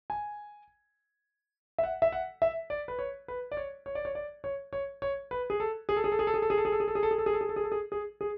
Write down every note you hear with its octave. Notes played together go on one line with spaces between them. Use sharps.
G#5
E5
F#5
E5
F#5
E5
D5
B4
C#5
B4
D5
C#5
C#5
D5
C#5
D5
C#5
C#5
C#5
B4
G#4
A4
G#4
A4
G#4
A4
G#4
A4
G#4
A4
G#4
A4
G#4
A4
G#4
A4
G#4
A4
G#4
A4
G#4
A4
G#4
A4
G#4
A4
G#4
G#4
G#4